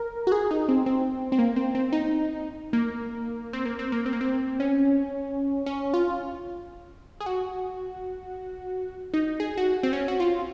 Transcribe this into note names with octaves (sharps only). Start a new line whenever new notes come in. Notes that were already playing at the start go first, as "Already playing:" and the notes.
Already playing: A#4
F#4
G#4
D#4
C4
C4
C4
A#3
C4
C4
D#4
A#3
C4
A#3
C4
A#3
C4
A#3
C4
C#4
C#4
F4
G#4
F#4
D#4
G#4
F#4
C4
C#4
F#4
F4